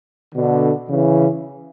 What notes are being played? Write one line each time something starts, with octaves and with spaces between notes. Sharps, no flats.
B2 D3
C#3 E3